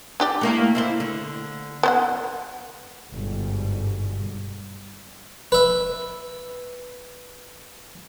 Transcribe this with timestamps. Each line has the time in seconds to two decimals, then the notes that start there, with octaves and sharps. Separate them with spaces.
0.20 D4 G4 D5
0.41 A3 A#3 E4
0.75 C4 E4 C5
1.00 D3
1.83 B3 C5 F#5
3.12 G1 G#2 B2 G3
5.52 B4 E5